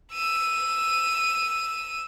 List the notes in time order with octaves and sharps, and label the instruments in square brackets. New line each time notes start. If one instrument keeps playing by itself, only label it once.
[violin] E6 D#7